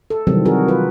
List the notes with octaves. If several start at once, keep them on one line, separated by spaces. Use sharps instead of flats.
A4
C3 D#3 E3 F#3 G3 C4
F#4 G#4 A#4
F4 B4